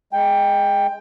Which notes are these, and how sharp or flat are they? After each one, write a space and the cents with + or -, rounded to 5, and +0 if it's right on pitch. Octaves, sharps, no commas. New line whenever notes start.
G#3 +0 G5 +15